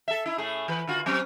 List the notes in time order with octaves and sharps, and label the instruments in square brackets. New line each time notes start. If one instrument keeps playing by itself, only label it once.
[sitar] A4 E5
D#4 E4
A2 A3 G#4
E3 B4
D3 F4 F#4
F#3 C4 C#4